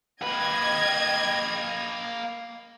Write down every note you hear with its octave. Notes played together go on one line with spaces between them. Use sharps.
A#3 B4 D#5 G5 G#6